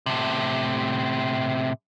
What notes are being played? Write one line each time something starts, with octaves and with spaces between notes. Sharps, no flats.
A2 C3